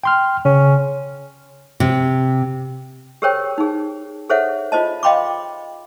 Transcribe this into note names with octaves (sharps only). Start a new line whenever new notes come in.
G5 C6 F6
C#3 C#4
C3
G4 G#4 A#4 C5 C#5 G5
D#4 G#4
G#4 A4 C5 C#5 E5 F#5
F4 C5 D#5 A5
D#5 F5 G5 B5 C6 D6